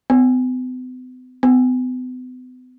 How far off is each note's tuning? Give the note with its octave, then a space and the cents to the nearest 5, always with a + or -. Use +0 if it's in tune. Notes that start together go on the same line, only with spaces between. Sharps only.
B3 +45
B3 +40